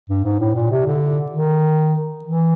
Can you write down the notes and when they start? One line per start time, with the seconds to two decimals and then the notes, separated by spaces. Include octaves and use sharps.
0.10 G2
0.24 G#2
0.40 A2
0.55 A#2
0.71 C3
0.86 D3
1.32 D#3
2.24 E3